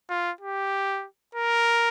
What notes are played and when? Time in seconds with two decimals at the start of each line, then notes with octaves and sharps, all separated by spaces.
0.10 F4
0.41 G4
1.35 A#4